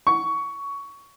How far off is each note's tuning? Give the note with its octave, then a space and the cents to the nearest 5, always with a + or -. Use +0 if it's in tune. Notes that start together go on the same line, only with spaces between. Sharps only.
C#6 +15